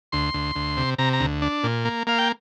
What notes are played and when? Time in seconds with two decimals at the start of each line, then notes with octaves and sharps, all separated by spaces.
0.12 D2 C6
0.34 D2
0.55 D2
0.77 C3
0.98 C3 A#5
1.13 A#5
1.20 D2
1.42 D4
1.64 A#2
1.85 A#3
2.07 A#3 F5
2.18 G5